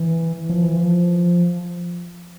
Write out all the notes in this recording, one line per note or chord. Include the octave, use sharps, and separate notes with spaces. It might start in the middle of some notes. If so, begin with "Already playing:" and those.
Already playing: E3
F3
E3
F3